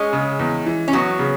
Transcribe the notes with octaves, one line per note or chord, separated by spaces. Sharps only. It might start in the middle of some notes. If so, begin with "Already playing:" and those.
Already playing: G#3 C#4
C#3
E2
E3
C#4
E2 F#3 B3
C#3